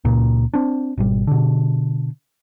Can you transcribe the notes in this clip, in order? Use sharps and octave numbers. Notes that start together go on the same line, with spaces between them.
C#2 A#2
C4 D4
G#1 B2 G3
B2 D3